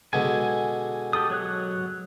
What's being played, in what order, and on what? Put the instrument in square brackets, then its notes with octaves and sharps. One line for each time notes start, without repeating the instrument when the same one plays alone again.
[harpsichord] B2 D3 G#3 [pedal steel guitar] G#5
[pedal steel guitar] G4 A4 D#6
F#3 C#5 F#6